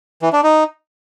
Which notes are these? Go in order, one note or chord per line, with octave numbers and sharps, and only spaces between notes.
E3
D4
D#4